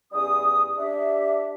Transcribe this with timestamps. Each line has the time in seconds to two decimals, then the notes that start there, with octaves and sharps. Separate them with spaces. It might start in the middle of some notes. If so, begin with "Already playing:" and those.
0.12 E2 G3 C#4 G4 D#6
0.77 D4 G4 E5